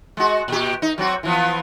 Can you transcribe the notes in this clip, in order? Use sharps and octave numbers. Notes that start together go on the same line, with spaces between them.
G#3 F#4
A#2 G4
D#4
F#3 C4 F#4
E3 F3 B3